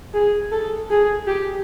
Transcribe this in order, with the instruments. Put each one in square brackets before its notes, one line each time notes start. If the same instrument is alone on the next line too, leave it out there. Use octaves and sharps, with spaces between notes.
[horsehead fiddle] G#4
A4
G#4
G4